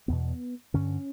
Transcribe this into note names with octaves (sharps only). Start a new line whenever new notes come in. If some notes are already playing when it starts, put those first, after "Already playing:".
E2 B2 B3
G2 D3 C#4